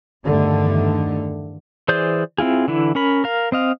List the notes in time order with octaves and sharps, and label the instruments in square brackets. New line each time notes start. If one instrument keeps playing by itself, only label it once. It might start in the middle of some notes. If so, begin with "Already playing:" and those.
[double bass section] E2 G2 D3 D#3 A3
[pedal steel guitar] E3 G#4 C5 D5 G6
C4 E4 F4 G#4
D3 E3 E4
C#4 A#4 B5
A#4 F5
C4 D#5 F5